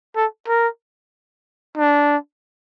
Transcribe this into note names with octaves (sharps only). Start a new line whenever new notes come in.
A4
A#4
D4